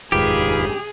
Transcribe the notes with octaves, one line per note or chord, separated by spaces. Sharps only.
F1 D#2 G#2 F4 G4 G#4 B4